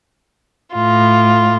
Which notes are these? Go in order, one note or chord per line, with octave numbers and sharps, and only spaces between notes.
A2 F4